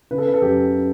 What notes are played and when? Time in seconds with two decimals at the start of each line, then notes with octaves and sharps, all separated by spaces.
0.11 C#3 B4
0.18 A4
0.26 B4
0.34 A4
0.41 F#2 G4